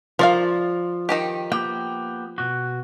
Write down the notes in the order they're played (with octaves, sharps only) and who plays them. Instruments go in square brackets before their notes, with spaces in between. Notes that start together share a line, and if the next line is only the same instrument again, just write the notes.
[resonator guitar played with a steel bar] F3 [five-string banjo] A#4 D5 F5
[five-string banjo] D#3 D#4 G4
[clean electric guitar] A#3 B3 G4 [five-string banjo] G5
[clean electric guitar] B2 F#4